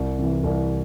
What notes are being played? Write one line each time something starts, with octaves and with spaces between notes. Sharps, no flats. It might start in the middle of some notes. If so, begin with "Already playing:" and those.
Already playing: C2
C3 E3
C2